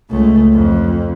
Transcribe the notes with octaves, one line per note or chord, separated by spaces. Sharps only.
C#2 A3
F2